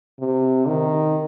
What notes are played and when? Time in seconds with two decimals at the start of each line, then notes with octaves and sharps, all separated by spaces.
0.20 C3
0.66 D#3